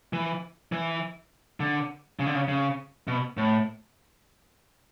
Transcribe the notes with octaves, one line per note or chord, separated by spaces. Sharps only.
E3
E3
D3
C#3
D3
C#3
C#3
B2
A2